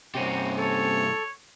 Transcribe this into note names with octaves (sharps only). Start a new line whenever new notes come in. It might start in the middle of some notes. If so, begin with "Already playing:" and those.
G2 C3 C4 C#4 F#4 G4
A4 C#5